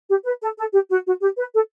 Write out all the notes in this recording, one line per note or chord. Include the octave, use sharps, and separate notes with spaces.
G4
B4
A4
A4
G4
F#4
F#4
G4
B4
A4